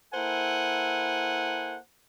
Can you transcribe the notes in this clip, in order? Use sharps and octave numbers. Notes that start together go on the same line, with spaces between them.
A#3 E4 A4 C5 F#5 G#5